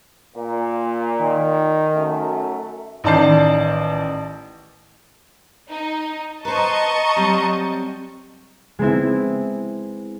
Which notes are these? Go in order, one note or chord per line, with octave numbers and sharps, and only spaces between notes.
A#2
D#3
F#2 A3
A1 D#3 D5 A5 G6 C7
D#4
B4 C5 D#5 A5 A#5 C#6
F#3 G3 C4
G#3 B3 C4 E4